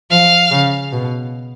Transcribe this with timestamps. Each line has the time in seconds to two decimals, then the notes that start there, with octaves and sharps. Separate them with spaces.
0.11 F3 F5
0.51 C#3
0.92 B2